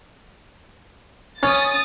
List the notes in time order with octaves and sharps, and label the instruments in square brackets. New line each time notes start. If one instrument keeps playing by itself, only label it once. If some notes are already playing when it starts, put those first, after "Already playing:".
[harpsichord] C#4 [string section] D#6 A6